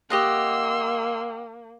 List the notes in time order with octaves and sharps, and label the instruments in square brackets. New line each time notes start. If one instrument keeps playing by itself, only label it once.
[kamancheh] A#3 [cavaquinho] G4 D#5 F#5 [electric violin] C6 E6